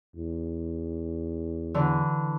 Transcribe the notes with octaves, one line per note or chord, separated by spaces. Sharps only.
E2
D3 E3